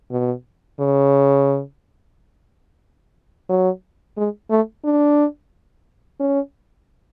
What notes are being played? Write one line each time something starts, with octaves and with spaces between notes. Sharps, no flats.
B2
C#3
F#3
G#3
A3
D4
C#4